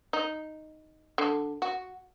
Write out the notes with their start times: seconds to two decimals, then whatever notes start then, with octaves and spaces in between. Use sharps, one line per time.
0.13 D#4
1.18 D3
1.62 F#4